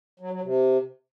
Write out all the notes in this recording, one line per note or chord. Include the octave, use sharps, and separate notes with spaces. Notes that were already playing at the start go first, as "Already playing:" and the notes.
F#3
F#3
C3